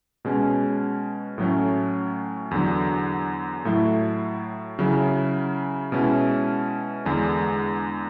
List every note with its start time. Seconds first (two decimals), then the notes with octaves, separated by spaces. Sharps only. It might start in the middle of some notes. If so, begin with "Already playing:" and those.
0.25 B2 G#3 C#4
1.38 A2 F#3 A3 C#4
2.51 E2 D3 F#3
3.65 A2 F#3 A3 E4
4.79 C#3 F#3 C#4 E4
5.92 B2 G#3 C#4 E4
7.05 E2 D3 G#3 D4